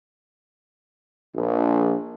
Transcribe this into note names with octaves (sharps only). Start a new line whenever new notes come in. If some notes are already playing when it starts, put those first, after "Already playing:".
A#1